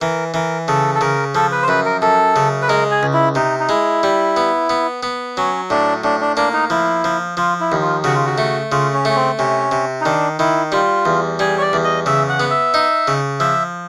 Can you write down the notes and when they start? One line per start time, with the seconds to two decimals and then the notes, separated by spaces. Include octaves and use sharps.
0.01 E3 A#4
0.34 E3 A#4
0.68 C#3 A4
0.95 A4
1.01 C#3 A#4
1.35 F3 A4
1.52 B4
1.63 C5
1.68 F#2 B4
1.85 A#4
2.02 F#2 A4
2.36 C#3
2.62 B4
2.68 G#3 A#4
2.91 G#4
3.03 C#2
3.13 E4
3.35 C3 D#4
3.59 D#4
3.69 G#3 E4
4.03 G3
4.37 B3
4.70 B3
5.03 B3
5.37 F#3 C#4
5.70 A2 D4
6.04 A2 D4
6.21 D4
6.37 A#3 D4
6.53 D#4
6.70 F3 E4
7.04 F3
7.37 F3 F4
7.60 E4
7.72 D#2
7.82 F4
8.04 C#3 F#4
8.15 F4
8.26 F#4
8.38 A3
8.72 C#3 F4
8.94 C#4
9.05 A3 C#4
9.16 C4
9.38 C3 C#4
9.71 C3
10.01 D#4
10.05 D#3 D4
10.39 D#3 E4
10.72 G3 F4
11.06 E2
11.39 G3 G#4
11.58 C#5
11.61 D5
11.73 E2
11.84 D#5
12.06 C#3 E5
12.29 F#5
12.40 B3
12.51 E5
12.74 D#4
13.08 C#3
13.40 F3 E5